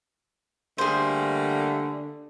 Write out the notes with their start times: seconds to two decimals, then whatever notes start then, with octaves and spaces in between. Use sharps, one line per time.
0.78 D3 G3 A3 A#3 G#4 C5